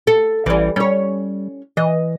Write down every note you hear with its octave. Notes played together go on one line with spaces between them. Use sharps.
A4
A1 E3 G3
G3 C#4 C#5
E3 D#5